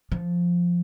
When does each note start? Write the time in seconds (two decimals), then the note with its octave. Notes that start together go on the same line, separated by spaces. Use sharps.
0.12 F3